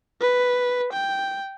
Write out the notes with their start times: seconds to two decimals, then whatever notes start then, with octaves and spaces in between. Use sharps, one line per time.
0.21 B4
0.93 G5